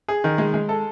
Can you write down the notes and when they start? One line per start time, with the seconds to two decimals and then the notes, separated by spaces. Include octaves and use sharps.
0.08 G#4
0.24 D#3
0.38 G#3
0.54 G#3
0.69 A4